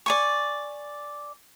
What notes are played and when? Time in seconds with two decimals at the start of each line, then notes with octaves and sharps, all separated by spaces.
0.06 D5 G#5 C#6